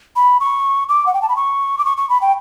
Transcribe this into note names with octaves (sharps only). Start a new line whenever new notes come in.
B5
C#6
D6
F#5
G5
A5
B5
C#6
D6
C#6
C#6
B5
G5